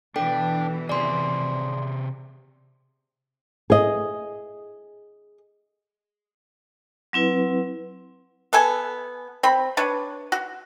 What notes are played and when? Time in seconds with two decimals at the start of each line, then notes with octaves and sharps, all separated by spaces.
0.16 B2 E3 D4 A4 G5
0.89 C3 G#4 D5 C6
3.70 G#4 D#5
7.13 F#3 C4 E4 B4
8.53 B3 A4 G#5
9.43 C4 B5
9.77 D4 B4 C#5
10.32 F#4